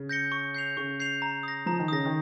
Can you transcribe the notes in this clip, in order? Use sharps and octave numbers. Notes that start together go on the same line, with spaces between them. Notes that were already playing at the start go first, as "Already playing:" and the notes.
Already playing: C#3
G6 A#6 C#7 G7
C#6
G6 C7 F7
C#3 C#6
G6 C7 F7
A#5
D#6 A#6
F3 A#5
D#3
C#3 D#6 A#6
D#3